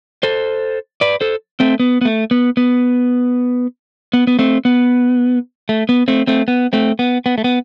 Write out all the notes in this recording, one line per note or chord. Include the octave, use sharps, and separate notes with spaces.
A4 C5
B4 D5
A4 C5
A3 C4
B3
B3
A3
B3
B3
B3
B3
A3 C4
B3
A3
B3
A3 C4
A3 C4
B3
A3 C4
B3
B3
A3
B3